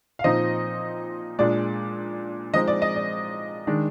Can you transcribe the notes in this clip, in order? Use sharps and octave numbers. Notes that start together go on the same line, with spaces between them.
F5
A#2 F3 C4 D#4 D#5
A#2 G#3 D4 D5
F3 G#3 C4 D#4 D#5
D5
D#5
D5
D#3 G#3 D4